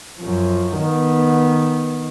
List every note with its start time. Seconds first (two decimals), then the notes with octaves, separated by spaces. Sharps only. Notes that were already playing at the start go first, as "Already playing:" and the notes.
0.20 F#2 F3
0.78 D#3 B3